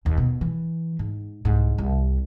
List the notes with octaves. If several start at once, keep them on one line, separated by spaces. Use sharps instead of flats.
D#1 D#2
B2
E3
G#2
C2 G#2
C2 C3